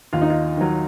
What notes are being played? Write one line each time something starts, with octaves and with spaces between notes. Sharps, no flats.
D#2 F4
D#4
F4
D#3 F#3